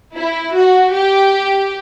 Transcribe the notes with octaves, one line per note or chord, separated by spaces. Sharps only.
E4
F#4
G4